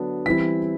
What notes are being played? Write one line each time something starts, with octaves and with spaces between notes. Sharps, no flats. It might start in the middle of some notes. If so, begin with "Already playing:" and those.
Already playing: D3 F#3 B3 D4
E3 G3 C4 E4 B6